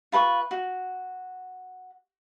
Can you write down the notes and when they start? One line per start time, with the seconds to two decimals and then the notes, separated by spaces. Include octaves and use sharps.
0.12 F4 B4 A5 C#6
0.51 F#4